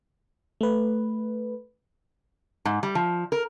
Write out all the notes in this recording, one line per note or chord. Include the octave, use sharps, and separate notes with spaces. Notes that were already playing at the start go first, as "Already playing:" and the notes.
A3 B4
G#2
G3
F3
A#4